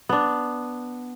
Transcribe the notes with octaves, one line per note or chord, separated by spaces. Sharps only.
B3 D4